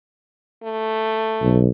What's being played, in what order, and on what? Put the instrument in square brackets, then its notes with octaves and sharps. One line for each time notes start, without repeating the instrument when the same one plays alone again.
[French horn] A3
[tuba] B1